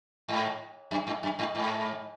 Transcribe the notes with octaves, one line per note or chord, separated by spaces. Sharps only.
G#2
F#2
G#2
F#2
G#2
G#2